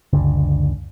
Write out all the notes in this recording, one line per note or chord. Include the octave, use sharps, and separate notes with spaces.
F#1 C#2 D3